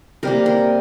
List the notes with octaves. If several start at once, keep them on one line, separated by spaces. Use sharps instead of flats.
C3 G3 A#3 A#4
A#4